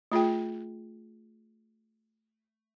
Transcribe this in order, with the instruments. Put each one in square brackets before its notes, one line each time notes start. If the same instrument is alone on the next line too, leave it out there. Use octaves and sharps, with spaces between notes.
[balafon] A3 F4 G#4 G5